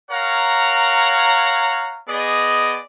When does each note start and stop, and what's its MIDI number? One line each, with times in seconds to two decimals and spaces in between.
0.11 1.99 70
0.11 1.99 73
0.11 1.99 77
0.11 1.99 78
0.11 1.99 82
2.08 2.79 59
2.08 2.79 68
2.08 2.79 74
2.08 2.79 75